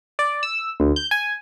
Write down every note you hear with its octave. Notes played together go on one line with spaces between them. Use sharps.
D5
E6
D2
G6
G#5